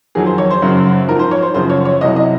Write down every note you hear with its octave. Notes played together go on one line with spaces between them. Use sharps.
F2 D#3 F#3 G#4
C5
C#5
C5
F#2 C#3 F#3
G#2 F3 A#4
C5
C#5
C5
F#2 C#3 F3 C5
C#5
C#5
C2 C3 F#3 D#5
D#5